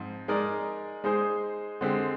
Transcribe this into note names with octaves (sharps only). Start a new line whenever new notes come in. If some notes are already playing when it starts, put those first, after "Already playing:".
Already playing: G#2 F3 C4
G#3 D#4 A#4 D5
G#3 D#4 G#4 C5
D3 G#3 C4 G4